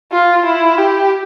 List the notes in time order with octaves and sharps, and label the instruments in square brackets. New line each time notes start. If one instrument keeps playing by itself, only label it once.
[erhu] F4
E4
G4